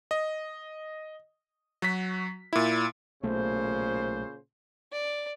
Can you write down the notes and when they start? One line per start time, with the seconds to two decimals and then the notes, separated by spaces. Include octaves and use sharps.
0.11 D#5
1.82 F#3 F#4 B6
2.53 A#2 E4
3.23 B1 A#2 C#3 A3 C5
4.92 D5